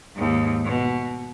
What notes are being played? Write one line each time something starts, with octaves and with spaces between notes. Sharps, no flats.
D#2 G#2
B2